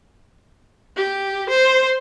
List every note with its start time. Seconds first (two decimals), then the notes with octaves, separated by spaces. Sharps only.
0.97 G4
1.50 C5